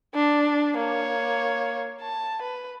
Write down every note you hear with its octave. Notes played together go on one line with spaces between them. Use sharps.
D4
A#3 C#5
A5
B4